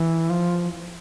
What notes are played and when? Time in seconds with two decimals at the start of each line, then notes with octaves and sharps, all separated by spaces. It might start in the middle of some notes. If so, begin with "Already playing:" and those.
Already playing: E3
0.30 F3